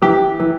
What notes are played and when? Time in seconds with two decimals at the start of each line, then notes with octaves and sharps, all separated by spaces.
0.02 E3 G4
0.39 E3